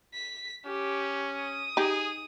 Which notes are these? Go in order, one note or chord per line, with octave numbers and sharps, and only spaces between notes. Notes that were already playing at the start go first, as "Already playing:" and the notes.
B6
C#4 G4
D#6
D#4 G4 G#4